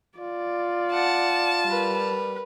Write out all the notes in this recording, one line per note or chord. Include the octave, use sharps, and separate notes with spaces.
F4 D5
F#5 A5
G3 A#4 B4